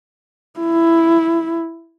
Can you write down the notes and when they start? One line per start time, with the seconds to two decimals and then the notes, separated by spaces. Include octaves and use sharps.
0.60 E4